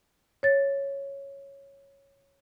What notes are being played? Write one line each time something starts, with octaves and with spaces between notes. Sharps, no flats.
C#5 A6